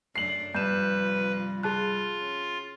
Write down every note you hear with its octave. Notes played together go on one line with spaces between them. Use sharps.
F#2 A3 D4 C7 F#7
G2 C3 F3 B4 G6 E7
F4 G#4 A5 F#6
C#4